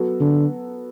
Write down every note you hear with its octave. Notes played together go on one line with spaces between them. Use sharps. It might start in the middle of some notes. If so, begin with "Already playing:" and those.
Already playing: F#3 B3 F#4 A4
D3